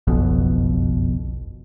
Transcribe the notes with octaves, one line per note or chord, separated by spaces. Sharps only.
F#1 B1 F2 B2